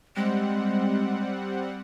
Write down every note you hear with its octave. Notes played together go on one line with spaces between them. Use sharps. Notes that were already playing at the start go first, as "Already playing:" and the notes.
G3 G#3 C4 F#5